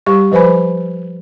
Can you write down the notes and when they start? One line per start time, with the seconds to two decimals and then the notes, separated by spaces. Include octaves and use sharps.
0.06 G3 G4 C#6
0.32 F3 B4 C5 G#5 B5